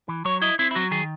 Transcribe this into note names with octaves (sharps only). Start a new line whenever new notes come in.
E3
F#3 C#5
E4 D#5
C4 E4
E4
F#3 F#4
D#3 G#4